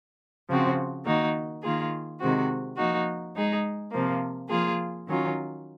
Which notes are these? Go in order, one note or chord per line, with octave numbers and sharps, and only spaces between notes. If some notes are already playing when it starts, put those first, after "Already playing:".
C#3 F3 C4 F#4
D#3 A#3 D#4 F#4
D#3 A#3 F4 G#4
C3 D#3 G#3 C4 F#4
F3 A#3 D#4 F#4
G#3 D#4 G#4
C3 F3 A#3
F3 A#3 F4 G#4
D#3 F#3 C#4 F4